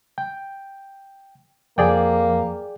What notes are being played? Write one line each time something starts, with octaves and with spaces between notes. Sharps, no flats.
G5
F2 A#3 G#4 D5 G5